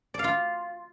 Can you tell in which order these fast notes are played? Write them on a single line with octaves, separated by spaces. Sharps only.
D5 F5 F4